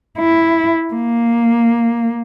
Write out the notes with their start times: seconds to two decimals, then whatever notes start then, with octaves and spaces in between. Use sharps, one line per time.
0.19 E4
0.94 A#3